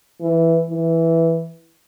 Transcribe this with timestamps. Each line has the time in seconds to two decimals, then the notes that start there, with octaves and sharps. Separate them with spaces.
0.21 E3
0.70 E3